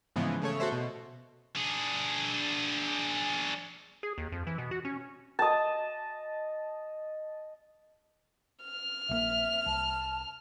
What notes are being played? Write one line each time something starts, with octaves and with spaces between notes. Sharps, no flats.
G#2 C#3 E3 F3 B3
C#3 A3 C#5
F#4 A4 C5 E5
B2
D4 G#4
G#4
D#2
F2
E3
B2
F#4
C#4
D#5 A5
F6
A#1 D#3 A#3 E5
C2 A5